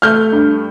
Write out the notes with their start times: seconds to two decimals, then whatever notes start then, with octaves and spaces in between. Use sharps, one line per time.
0.02 A3 F6 G6
0.32 G2